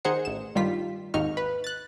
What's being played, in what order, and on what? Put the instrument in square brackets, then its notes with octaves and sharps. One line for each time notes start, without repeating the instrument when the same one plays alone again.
[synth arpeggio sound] D#3 G#4 A#4 C5 F#5 C#7
A1 E7
G2 D#3 G3 F4 B6
G#1 D#2 D#4 C#6 F6
B4
F#6 A6